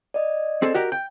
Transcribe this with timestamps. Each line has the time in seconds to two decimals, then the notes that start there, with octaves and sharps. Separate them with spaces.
0.14 D5 D#5
0.62 C4 G#4 A4
0.75 F#4 G4 A#4
0.92 G5